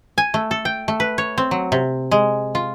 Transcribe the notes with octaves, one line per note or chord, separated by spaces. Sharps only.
G#5
A3
A4
G5
A3
B4
C#5
C4
F#3
C3
G#3
F4